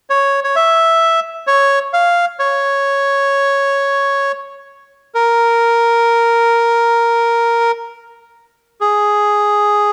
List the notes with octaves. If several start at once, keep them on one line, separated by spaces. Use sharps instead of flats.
C#5
C#5
E5
C#5
F5
C#5
A#4
G#4